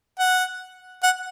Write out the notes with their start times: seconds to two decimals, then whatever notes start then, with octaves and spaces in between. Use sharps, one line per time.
0.19 F#5
1.03 F#5